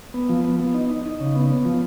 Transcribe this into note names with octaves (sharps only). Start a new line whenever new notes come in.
B3
F3
B3
B3
D#4
D#4
D#4
C#3
B3
B3
F3